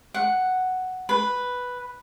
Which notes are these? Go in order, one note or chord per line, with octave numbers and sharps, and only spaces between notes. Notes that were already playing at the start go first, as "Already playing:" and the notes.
F#5
B4